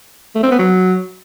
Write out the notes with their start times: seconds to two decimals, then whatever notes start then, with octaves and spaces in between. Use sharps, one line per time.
0.35 A3
0.43 C4
0.51 B3
0.59 F#3